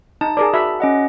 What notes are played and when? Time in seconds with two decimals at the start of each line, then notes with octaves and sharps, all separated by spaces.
0.21 D#4 A5
0.37 G#4 A#4 D5
0.53 F#4 E5 B5
0.80 C#4 D#5 F#5